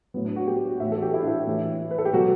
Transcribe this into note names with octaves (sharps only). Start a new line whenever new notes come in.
A2 F#3 B3
D4
F#4
G4
A2 E3 E5
A4
F#4
G4
E4
D4
E4
A2 E3
B4
A4
G4
B2 F#3 F#4